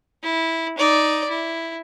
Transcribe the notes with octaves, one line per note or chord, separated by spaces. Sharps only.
E4
D#4 D5
E4